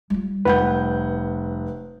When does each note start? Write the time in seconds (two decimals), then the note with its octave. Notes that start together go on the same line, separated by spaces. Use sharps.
0.10 G3 F4
0.45 F1 B4 F#5 G6